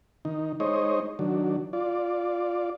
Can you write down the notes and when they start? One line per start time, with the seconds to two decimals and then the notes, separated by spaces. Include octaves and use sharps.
0.25 D#3 D#4
0.60 G#3 D#4 C5 C#5 D#5
1.19 D#3 F#3 D4
1.73 F4 D5